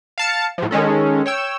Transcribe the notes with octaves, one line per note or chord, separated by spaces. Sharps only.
F5 A5 C#7
A2 F3
D#3 G#3 C#4 A4
C#5 G5 E6